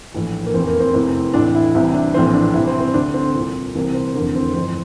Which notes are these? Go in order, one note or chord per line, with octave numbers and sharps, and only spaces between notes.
A#1 A2 E3
A#3
F1 E2 E3 C4
A#3
C4
F1 E2 C3 E3 C4
A1 A2 E3 D4
E4
C2 C3 E3 E4
D4
A#1 A2 E3 C4
D4
C2 C3 E3 E4
C4
C4
D2 D3 D4
C4
C2 A#2
C2 C3 E3 A#3
C4
F1 E2 D3 A#3
C4
G1 F2 E3 C4